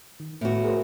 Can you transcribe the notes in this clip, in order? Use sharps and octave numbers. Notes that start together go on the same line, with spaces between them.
D#3
A2 A3 B3 F#4
G#4 A#4 C5